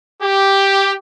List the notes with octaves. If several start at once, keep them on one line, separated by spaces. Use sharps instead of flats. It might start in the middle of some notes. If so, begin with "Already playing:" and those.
G4